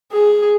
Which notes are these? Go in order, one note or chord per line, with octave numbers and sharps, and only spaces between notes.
G#4